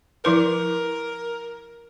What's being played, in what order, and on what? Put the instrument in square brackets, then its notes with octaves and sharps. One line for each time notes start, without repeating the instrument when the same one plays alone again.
[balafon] F3 E4 B4 [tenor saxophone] A#4